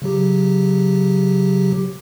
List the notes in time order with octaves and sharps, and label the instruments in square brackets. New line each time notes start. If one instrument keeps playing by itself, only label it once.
[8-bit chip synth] C#3 F#3 G4